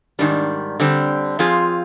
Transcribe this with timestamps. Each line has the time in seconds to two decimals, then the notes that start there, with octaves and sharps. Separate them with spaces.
0.19 G#2 D#3 G3 D4
0.80 D3 G3 C4
1.39 F3 C4 F4 G#4